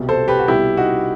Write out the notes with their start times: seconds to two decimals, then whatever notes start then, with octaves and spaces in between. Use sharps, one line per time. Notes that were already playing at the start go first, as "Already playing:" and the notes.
Already playing: C2 B2 G3
0.09 A4 C5
0.28 G4 B4
0.39 F#4
0.48 C2 B2 G3 E4 G4
0.77 D#4 F#4